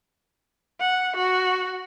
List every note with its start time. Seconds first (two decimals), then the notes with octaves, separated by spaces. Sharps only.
0.80 F#5
1.15 F#4